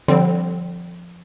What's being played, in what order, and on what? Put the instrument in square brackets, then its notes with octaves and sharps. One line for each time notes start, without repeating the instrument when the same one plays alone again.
[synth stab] D3 G3 C4 [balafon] F3